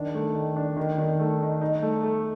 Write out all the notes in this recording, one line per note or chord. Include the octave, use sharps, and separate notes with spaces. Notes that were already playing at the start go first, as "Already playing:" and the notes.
Already playing: D#3 D4
A3
D#3
D4
D#3
D#3
A3
D#4
D#4
A3
A3